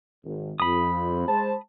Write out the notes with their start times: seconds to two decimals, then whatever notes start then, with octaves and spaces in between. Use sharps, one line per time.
0.24 G#1
0.60 F2 B5 D#6
1.28 G#3 C5 A5